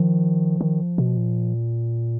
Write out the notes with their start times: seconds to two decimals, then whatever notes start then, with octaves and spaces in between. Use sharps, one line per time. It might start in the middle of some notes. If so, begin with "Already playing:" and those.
Already playing: D#3 F3
0.61 D#3
0.98 B2
1.17 A#2